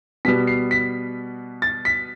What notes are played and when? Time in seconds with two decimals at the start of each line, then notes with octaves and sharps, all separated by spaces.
0.25 B2 G3 B3 B6
0.47 C7
0.71 B6
1.62 A6
1.85 B6